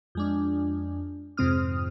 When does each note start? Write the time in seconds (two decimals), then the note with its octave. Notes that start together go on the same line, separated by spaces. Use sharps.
0.15 F2 G#3 D4
1.37 F2 G#2 C3 C4 D#6 F6